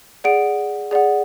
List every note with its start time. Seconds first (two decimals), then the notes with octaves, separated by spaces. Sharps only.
0.24 G#4 D5 F#5 D7
0.91 G#4 D5 F#5